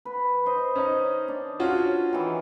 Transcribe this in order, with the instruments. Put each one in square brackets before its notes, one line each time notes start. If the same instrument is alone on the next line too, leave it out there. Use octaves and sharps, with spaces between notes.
[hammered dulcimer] B4
C5 D#5
[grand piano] C#4 D#4
[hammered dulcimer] D4
[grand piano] C#4 F4 F#4
[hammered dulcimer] D#3 E3